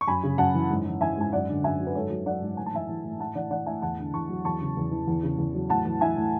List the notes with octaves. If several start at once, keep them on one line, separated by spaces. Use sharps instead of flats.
C#6
F#2 G#5 B5
C#3
F#2 F#5 A5
E3
G#2
E3
E3 E5 G#5
G#2 G#5
F#2 D5 F#5
D3
F#2 E5 G#5
F#3
B4
G#2 A4 C#5
F#3
F#3 D5 F#5
G#2
A2 G#5
A5
E3 E5 G#5
E3
A2
A2 F#5 A5
E3 D5 F#5
E3 D5 F#5
A2 E5 G#5
E2 F#5 A5
D3
E2 A5 C#6
F#3
E2 A5 C#6
C#3
E2
E3
E2
C#3
E2
F#3
A2 F#5 A5
E3
E3 E5 G#5
A2